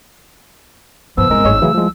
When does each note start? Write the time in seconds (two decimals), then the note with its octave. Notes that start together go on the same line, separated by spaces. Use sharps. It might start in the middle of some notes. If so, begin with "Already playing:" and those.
1.17 C2 G2 F3 B3 E6
1.30 G1 G#2 G#3 C4 A#4
1.45 G#1 G2 G#4 C#5 D#5
1.62 C#3 E3 F#3 A3 E4
1.75 C2 F3 G#3